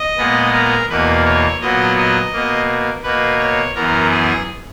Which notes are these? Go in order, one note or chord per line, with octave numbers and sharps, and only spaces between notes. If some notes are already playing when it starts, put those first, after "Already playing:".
Already playing: D#5
A#2 G#3 B3
A#4
E2 B2 A#3 B4
C#5
A#2 F#3 B3 D#5
D#5
B2 A#3
B2 A#3 B4
C#5
F#2 E3 B3 A#4
G#4